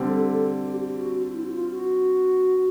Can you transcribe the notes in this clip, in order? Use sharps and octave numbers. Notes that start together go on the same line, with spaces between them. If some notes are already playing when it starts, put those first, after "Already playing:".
Already playing: D3 G3 C4
A4
A4
G4
F#4
G4
F#4
F4
E4
F#4
F4
F#4